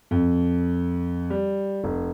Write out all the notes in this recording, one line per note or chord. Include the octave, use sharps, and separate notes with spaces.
F2
G3
F1